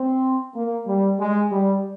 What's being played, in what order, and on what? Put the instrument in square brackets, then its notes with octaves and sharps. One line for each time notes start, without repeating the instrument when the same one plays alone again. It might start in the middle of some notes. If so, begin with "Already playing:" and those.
Already playing: [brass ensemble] C4
A#3
G3
G#3
G3